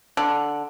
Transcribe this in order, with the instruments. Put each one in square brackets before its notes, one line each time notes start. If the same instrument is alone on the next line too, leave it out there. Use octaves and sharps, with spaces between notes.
[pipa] D3